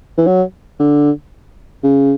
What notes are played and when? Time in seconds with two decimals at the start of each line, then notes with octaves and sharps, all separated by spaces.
0.18 E3
0.27 F#3
0.79 D3
1.83 C#3